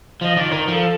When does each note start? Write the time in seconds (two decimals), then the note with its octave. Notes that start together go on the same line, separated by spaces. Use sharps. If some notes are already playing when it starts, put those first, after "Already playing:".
0.22 F3 D#5
0.37 D#3 D5
0.52 D#3 A#4
0.67 F3 A4 A#4